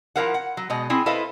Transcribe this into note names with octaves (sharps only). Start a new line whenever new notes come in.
F3 B3 E4 A#4 F5 F#5
F#5
F#3
B2 G#3 D#5
C4 E4 G#4 G#5
E4 A4 B4 C5 D#5 F5